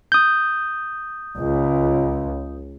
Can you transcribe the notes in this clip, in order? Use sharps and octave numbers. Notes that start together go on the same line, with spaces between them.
D#6 G6
C#2